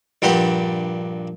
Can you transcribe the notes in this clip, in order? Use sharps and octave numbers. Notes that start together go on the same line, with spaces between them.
A#1 G2 G4 F#5